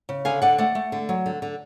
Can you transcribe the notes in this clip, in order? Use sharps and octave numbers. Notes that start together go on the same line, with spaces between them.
C#3
D3 F5 G#5
D3 D5 F#5
A3 D5 F#5
A3
D3
F#3
D3
D3